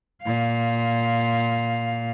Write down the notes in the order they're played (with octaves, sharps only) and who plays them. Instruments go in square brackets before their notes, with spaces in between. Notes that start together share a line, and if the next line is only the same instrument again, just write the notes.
[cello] A#2 F5